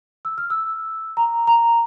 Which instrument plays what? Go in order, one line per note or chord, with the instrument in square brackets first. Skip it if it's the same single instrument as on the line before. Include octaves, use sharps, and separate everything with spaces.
[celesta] E6
F6
E6
A#5
A#5